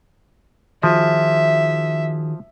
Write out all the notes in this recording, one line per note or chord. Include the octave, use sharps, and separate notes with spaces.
D#3 F3 F#4 G#4 E5